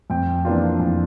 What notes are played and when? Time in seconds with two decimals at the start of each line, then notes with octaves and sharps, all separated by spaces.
0.10 F2 G5
0.45 E3 A#3 D4 F4
0.80 F2